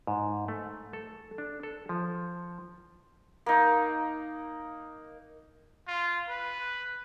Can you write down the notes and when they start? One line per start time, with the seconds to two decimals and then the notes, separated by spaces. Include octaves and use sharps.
0.07 G#2
0.48 A3
0.93 A4
1.38 D4
1.63 A4
1.89 F3
3.46 A#3 D#4
5.88 F4
6.29 B4